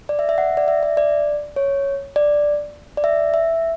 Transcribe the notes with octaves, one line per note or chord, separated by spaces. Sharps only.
D5
E5
E5
F#5
D5
E5
E5
D5
C#5
D5
D5
E5
E5